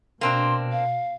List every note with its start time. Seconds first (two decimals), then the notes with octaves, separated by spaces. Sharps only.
0.21 B2 A#3 C4 D4 C6
0.72 F5